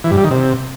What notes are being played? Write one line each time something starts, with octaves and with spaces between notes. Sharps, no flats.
E3
G2
G3
D#3
C3